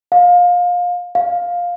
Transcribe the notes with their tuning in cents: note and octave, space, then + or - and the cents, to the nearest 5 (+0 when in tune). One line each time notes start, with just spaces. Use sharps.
F5 +25
F5 +10